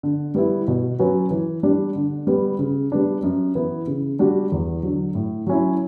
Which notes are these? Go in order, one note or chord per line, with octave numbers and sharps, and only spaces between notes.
D3
G3 B3 E4
B2
F#3 C#4 F#4 B4
E3
G3 D4
D3
G3 B3
C#3
G3 B3 D4
F#2
E3 B3 E4
C#3
G3 D4 F#4
E2
D3 F#3
A2
F#3 C#4 E4